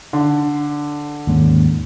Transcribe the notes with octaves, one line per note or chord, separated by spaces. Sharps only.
D3
D#2 G#2 C#4